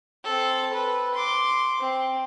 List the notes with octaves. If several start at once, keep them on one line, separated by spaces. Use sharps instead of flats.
C4 A4
B4
C6 D6
C4